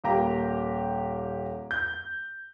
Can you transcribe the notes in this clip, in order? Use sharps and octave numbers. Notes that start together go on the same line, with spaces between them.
D#1 A#3 G4 A#5
G6